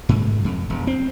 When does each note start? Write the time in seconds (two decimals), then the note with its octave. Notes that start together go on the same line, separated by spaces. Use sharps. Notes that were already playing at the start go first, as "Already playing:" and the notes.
0.09 G#2
0.45 F2
0.70 E1
0.87 C4